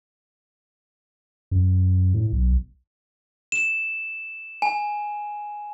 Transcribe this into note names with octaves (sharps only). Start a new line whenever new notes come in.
F#2
A2
B1
E7
G#5